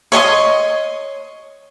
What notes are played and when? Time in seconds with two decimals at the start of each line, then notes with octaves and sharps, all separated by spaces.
0.12 C#5 D#5 C6 D#6